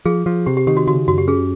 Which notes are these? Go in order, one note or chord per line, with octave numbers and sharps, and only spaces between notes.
F3 G#4
F3
C3 G4
G4
D#3 G4
F#4
C#3 F#4
F#2 F#4
G4
C#4 G#4